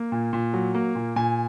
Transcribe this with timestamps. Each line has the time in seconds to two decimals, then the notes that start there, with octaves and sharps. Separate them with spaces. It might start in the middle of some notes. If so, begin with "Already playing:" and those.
Already playing: A#3
0.12 A#2
0.33 A#2
0.54 F#3
0.75 A#3
0.95 A#2
1.16 A#2 G#5